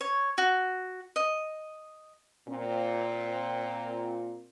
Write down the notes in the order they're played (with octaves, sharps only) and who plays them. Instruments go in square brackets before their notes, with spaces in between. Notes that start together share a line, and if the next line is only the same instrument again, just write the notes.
[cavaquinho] C#5
F#4
D#5
[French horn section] A#2 C4